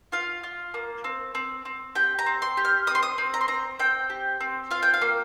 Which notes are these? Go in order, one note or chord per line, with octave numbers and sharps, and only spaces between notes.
F4 F5
F4
A#3
C4
C4
C4
G4 G5
A#5
C4
C6
G4
F6
C4 D#6
C6
D#6
C4
A#5
C6
C4 A#5
C4 G5
G4
C4
F4 F5
G5
F5
A#3